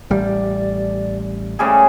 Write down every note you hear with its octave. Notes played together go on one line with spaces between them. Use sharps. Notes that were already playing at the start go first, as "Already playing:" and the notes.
A1 G3 D5
C#3 G3 A3 G#4